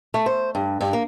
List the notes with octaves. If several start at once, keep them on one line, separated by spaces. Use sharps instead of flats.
A3
C5
G2
G2
A#3